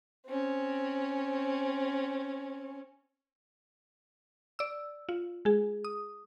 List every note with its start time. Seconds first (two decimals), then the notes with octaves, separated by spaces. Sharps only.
0.26 C4 C#4
4.59 D5 E6
5.09 F4
5.45 G#3 G#4
5.84 D#6